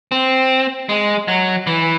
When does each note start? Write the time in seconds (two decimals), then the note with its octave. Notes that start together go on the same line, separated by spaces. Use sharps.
0.12 C4
0.89 G#3
1.28 F#3
1.67 E3